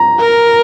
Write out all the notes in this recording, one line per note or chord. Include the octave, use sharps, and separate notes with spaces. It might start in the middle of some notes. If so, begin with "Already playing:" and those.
Already playing: A#5
A#4